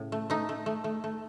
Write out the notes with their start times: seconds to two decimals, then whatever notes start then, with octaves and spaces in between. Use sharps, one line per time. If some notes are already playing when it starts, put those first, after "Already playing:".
Already playing: A2 C#3
0.12 A3
0.30 A3 D#4
0.49 A3
0.66 A3
0.84 A3
1.04 A3